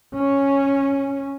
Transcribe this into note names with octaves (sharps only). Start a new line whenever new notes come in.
C#4